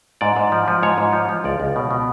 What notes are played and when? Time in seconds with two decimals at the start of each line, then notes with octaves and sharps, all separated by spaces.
0.21 G#2 D5
0.37 G#2
0.52 F3
0.68 F3
0.83 G#2 C#5
0.98 G#2
1.13 F3
1.29 F3
1.44 C#2 D5
1.60 C#2
1.76 B2
1.91 B2